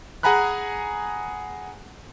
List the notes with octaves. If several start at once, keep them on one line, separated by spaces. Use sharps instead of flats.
G#4 F#5 G#5 A#5 B5 F#6